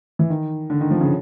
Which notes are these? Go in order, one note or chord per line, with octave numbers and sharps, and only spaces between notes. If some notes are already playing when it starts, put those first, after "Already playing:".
E3
D#3
D3
D#3
F3
C#3